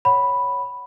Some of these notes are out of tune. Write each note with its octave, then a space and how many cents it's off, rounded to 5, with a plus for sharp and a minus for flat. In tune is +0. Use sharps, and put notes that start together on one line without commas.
C#5 +0 F#5 +5 B5 +0